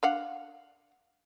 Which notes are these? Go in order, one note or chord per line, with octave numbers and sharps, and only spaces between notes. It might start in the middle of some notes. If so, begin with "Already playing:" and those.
D4 F5 F#5